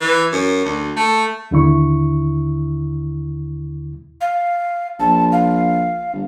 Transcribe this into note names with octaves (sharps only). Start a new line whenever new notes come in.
E3
F#2
D2
A3
D#2 D3 E4 C#6
F5
A#1 A5
F5
G1